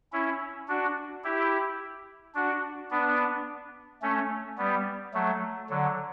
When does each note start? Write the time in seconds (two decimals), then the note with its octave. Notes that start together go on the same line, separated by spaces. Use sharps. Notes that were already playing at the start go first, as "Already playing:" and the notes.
0.13 C#4 E4
0.68 D4 F#4
1.24 E4 G4
2.35 D4 F#4
2.91 B3 D4
4.02 A3 C#4
4.58 G3 B3
5.14 F#3 A3
5.70 D3 F#3